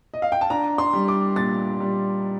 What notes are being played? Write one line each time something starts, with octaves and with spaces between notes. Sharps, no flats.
D#5
F5
G5
A5
D4 A#5
C6
G3
D6
A#2 A6
G3